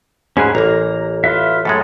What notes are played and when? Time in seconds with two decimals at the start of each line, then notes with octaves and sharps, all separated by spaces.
0.37 G#2 C#4 G#4 B4
0.55 A1 A#3 A#5
1.24 F4 B4 E5
1.65 F#2 A2 G#3 A4